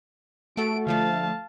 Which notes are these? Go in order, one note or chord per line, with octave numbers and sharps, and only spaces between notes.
A3 F#4 A4 D7
D3 F3 A3 F5 A5